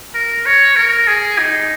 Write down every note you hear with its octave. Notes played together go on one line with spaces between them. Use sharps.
A#4
C#5
A#4
G#4
D#4